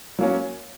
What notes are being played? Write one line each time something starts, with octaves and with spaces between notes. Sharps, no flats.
F#3 A#3 C#4